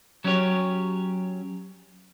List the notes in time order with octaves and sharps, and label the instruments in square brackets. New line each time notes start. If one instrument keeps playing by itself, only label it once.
[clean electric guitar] F#3 C#4 G4 C#5